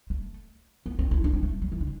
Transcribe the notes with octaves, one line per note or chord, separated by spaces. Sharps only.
A3
B3
C4
E4
D4
C4
A3
F#3
E3
D3